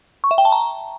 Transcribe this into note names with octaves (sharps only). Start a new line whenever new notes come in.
C#6
E5
G5
A5
A#5